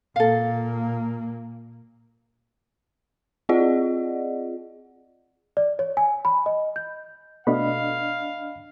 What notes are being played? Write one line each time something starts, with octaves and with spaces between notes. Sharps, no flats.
A#2 A#3 A4 F5
C4 F4 G#4 D5 D#5 F#5
D5
C#5
G#5
B5
D#5
G6
B2 A3 B3 D4 D#5 F5 B5